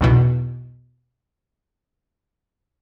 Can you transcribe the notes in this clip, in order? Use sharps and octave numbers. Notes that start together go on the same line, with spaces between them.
B1 E2 B2